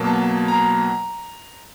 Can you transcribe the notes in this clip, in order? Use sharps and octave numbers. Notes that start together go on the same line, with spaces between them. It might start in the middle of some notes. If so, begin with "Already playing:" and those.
Already playing: B2 F#3 A#3 A5
A#5